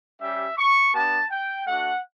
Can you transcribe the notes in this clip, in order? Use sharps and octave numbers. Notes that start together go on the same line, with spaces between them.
G3 C#4 G4 E5
C#6
B3 D4 G4 A5
G5
A3 D4 F#4 F#5